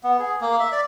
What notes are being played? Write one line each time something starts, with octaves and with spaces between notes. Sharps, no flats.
B3
G#4
A#3
E5
D5